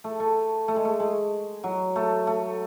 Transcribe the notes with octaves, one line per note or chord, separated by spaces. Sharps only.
A3
A3
A3
G#3
A3
G#3
F#3
A3
A3